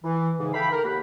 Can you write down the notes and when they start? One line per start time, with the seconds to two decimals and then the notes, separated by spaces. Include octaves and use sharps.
0.04 E3
0.39 G#2 C#3 E3
0.53 A4 E5 F5 G5 B5
0.71 A#4
0.84 D#2 A#3 F#5 B5